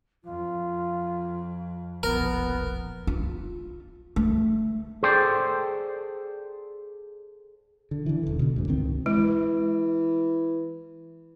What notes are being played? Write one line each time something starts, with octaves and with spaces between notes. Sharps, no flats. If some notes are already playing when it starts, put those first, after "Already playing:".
F2 F4
E1 A#1 F3 B3 A#4
F4
A3
G#4 A4 C5 D5 G5
D3
D3 E3
E1 D3
B2 D3
D2 G#2
C#2 B2 D#3 C4
E3 G#3